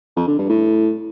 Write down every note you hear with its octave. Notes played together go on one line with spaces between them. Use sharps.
F2
D3
G2
A2